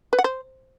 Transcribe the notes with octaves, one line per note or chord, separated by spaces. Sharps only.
B4
F#5
C5